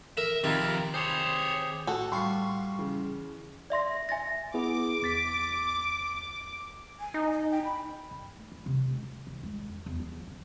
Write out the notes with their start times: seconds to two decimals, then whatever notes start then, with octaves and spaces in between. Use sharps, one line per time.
0.17 A#4 E5
0.44 F2 C3 D#3 A#4 B5
0.94 G4 G#4 C5 C#5
1.87 A2 F#4 A4 G5
2.12 G3 F4 C6 C#6
2.79 C#3 E3
3.70 D5 E5 C6 A#6
4.09 E5 G#5 A6 A#6
4.54 B3 E4 G#4 D6
5.02 E2 A6 B6
7.00 G#5
7.14 D#4
7.31 D#5
7.51 G5
7.64 B5
8.11 G2
8.37 A3
8.52 E3
8.66 C3
8.91 G#3
9.03 D2
9.27 D#3
9.43 G#3
9.69 F2
9.86 E2
10.00 F3
10.27 D3